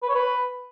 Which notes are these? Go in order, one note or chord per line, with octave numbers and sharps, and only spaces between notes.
B4
C#5
B4